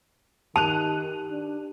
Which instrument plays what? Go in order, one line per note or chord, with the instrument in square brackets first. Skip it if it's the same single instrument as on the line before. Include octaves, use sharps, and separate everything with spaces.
[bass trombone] D#3 [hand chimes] G4 [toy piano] A5 [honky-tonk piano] F#6 D#7 F7
[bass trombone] D4